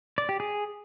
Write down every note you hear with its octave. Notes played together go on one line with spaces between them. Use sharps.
D5
G4
G#4